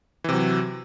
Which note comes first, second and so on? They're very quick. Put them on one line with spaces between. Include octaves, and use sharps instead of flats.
E3 C3 F#3